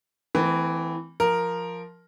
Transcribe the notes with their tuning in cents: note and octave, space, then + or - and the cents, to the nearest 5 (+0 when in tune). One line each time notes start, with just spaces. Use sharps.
E3 +0 A3 +0 C4 -35
F3 +0 A#4 +0